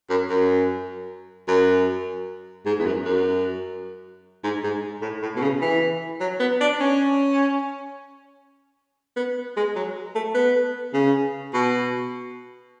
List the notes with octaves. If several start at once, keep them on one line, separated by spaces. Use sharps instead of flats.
F#2
F#2
F#2
G#2
E2
F#2
F#2
G#2
G#2
A2
A2
B2
C#3
E3
F#3
B3
D4
C#4
B3
G#3
F#3
A3
B3
C#3
B2